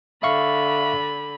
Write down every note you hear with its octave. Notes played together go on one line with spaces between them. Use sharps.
D3 E5 F5 B5 C#6